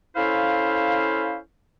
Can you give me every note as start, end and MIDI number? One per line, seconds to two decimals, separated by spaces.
0.16 1.37 61
0.16 1.37 64
0.16 1.37 69
0.16 1.37 72
0.16 1.37 77